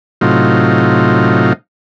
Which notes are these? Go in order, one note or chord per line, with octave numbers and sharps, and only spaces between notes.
A2 C3 F#3 D#4 F4